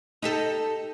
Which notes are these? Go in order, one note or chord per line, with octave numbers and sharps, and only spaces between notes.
D#4 G4 A4